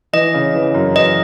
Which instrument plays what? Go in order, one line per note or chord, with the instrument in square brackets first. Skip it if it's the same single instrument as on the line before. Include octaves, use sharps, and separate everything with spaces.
[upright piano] E3 [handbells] D#5
[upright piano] C#3
E3
F#2
[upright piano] E3 [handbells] D#5